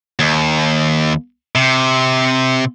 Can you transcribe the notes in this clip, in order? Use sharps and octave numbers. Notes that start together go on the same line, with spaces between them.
D#2
C3